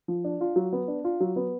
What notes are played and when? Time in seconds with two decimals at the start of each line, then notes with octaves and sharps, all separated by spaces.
0.08 F3
0.24 D4
0.41 F4
0.56 F#3
0.73 B3
0.88 D4
1.04 F4
1.20 F#3
1.36 B3